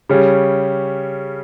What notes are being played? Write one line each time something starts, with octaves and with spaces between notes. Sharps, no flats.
C#3 G3 C#4